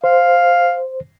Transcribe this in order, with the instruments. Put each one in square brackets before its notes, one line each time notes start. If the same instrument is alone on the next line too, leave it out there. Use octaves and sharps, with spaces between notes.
[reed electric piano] C5 [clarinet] F5